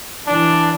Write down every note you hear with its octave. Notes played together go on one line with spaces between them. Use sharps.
E3 D4